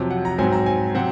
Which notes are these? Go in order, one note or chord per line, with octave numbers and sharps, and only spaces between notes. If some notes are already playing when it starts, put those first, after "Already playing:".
Already playing: F2 C3 F#3
F#5
A#5
G#2 F#3 C4 G#5
A#5
G#5
C3 F#3 C4 F#5